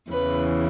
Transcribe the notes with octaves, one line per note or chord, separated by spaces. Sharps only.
E2 C#3 E3 B4